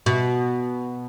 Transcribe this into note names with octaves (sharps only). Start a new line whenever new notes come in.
B2